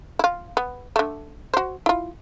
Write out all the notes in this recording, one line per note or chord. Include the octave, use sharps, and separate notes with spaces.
E4 F4
B3
D3 A3
F#4 C5
E4 F4